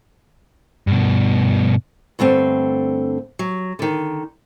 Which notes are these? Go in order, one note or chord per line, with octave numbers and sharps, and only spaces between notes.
G2 B2
G2 D3 A3 C4
F#3
D3 D#3